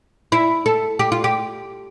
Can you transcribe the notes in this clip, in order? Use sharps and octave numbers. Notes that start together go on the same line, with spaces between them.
E4
A4
G4
F4
G4